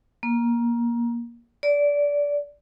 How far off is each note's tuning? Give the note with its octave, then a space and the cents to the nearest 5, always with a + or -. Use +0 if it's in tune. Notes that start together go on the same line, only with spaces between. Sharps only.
A#3 +20
D5 -20